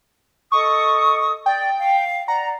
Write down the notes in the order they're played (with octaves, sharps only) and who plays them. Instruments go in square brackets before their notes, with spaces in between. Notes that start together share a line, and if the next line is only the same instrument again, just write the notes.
[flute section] A4 D#5 D#6 [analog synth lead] C#6
[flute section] D5 [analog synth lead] G5
[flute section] F5
[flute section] D5 F#5 [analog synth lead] A#5